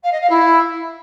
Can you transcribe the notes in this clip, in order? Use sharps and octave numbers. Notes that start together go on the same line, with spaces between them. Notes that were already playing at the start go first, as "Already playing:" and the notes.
F5
D#5
F5
E4